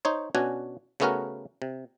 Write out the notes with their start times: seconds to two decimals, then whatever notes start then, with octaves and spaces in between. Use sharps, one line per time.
0.05 D#4 C5 C#5
0.35 B2 C#4 D4 F#4 G#5
1.00 C#3 A3 B3 C#4 F#4 A#4
1.62 C3